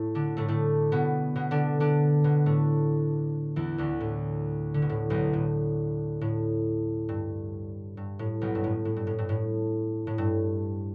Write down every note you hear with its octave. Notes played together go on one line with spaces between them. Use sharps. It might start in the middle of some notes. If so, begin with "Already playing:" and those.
Already playing: A2 A3
D3 D4
A2 A3
A2 A3
B2 B3
B2 B3
D3 D4
D3 D4
B2 B3
A2 A3
E2 E3
D2 D3
A2
D3
B2
A2
B1 B2
A2
A2
G2
G2
A2
B1 B2
G2
A2
A2
G2
A2
G2
A2
A2
G2